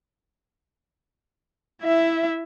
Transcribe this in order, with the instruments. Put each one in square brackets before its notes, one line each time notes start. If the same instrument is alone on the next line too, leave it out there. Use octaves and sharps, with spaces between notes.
[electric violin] E4 E5